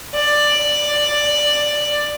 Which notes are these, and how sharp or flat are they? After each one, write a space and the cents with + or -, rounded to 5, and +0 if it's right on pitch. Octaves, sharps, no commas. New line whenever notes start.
D5 +10